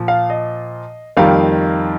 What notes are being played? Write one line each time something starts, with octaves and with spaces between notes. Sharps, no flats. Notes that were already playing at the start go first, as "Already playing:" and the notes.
Already playing: A#2 F3
F5
D#5
F2 D#3 G3 A#3 F5